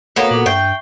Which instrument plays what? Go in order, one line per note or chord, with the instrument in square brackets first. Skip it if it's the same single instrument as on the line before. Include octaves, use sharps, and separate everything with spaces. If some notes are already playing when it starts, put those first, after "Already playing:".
[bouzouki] A#3 B3 F#4 [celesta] A4 C#5 F5
[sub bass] A#2 [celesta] A4 D6 F#7
[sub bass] G2 [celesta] E5 C#6 C7 [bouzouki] G5